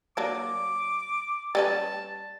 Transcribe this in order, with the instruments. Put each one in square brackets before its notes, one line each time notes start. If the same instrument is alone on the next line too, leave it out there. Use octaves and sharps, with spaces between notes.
[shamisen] F#3 A#3 D4 [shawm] D6
[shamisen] G3 C#4 B4 [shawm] A5